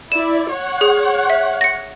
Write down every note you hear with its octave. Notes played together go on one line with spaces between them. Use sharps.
E4 D5 E7
C#5 F#5
G#4
E5
A#6 C#7